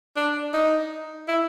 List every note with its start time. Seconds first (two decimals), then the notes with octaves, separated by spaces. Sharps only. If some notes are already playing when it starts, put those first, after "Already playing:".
0.16 D4
0.54 D#4
1.28 E4